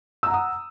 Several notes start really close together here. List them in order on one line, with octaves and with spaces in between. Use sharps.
E6 A#5 F#5 D#6